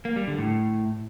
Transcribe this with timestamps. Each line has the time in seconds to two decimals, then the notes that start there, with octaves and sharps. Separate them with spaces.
0.05 A#3
0.16 G3
0.27 D3
0.38 A2